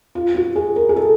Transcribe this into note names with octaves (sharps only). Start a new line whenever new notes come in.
F4
F#4
G#4
A#4
G#4
A4